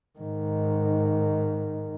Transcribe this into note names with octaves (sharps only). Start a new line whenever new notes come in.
G#2 D#3